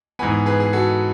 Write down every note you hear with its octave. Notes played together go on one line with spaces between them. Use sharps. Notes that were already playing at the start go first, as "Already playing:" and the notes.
G#2 E3 B3 G#5 B5
G#4 B4
G#4
F#4 A4